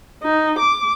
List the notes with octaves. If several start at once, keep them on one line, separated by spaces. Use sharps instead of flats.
D#4
D6